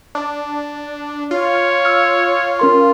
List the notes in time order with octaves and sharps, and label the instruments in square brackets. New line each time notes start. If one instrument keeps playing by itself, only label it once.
[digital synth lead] D4
[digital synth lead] F4 [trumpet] C#5
[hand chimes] E6 F6
C#4 A#4 C6